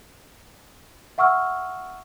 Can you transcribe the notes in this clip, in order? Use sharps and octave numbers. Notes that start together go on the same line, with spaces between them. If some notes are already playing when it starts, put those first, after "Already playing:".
E5 F#5 C#6 E6 F6